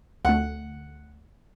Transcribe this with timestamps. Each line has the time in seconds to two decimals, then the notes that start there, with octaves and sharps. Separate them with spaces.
0.25 D2 A3 F#5